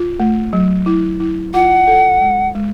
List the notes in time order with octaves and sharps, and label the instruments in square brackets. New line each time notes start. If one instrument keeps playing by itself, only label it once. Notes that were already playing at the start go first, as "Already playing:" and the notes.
Already playing: [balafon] F4
A3
F#3
E4
E4
[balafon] F4 [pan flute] F#5
[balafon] A4
G#3
G#3